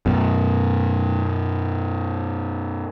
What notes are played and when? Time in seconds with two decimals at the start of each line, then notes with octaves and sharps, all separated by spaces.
0.06 F#2 B2